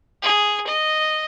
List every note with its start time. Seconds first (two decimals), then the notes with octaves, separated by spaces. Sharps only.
0.22 G#4
0.67 D#5